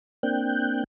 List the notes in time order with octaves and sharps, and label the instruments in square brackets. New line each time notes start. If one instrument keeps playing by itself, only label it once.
[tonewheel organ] A#3 C4 D4 G5 F#6 G6